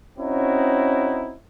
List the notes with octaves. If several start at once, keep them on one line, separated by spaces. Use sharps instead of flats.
C4 C#4 D#4 E4 F#4